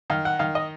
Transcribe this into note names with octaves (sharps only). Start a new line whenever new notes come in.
D#3 F5
F#5
D#3 F5
D#5